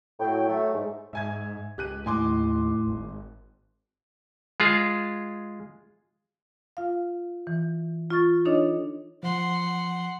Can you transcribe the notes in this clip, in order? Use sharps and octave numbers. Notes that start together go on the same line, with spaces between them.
A2 F#3 G5
F#3 A3
G#2
G#2 E5 G#5 G#6
C#2 G4 F#6 D#7
D#2 A2 G#5 C6 D6
G#1
G#3 F4 G#4
F4 F5
E3
F4 C#6 A6
D4 D#4 A4 C#5 D#5
F3 F#5 C6